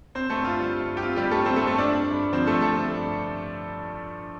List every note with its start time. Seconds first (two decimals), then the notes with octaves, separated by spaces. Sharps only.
0.15 C4 C5
0.30 A3 A4
0.37 G2
0.44 F4
0.60 G3
0.81 G2
0.97 G4
1.02 C4 F4
1.16 G3 G4
1.24 G2
1.31 A3 A4
1.46 G3 C4 C5
1.56 A3 A4
1.67 G2 A3 A4
1.78 D4 D5
1.89 C4
2.11 G2
2.33 F3 C4 C5
2.47 A3 A4
2.55 G2
2.61 A3 A4
2.76 C4
2.97 G2